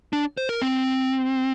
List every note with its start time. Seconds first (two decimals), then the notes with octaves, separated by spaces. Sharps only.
0.13 D4
0.38 C5
0.49 A#4
0.62 C4